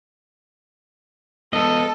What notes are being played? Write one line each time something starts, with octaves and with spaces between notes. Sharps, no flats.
G#3 B3 A4 D#5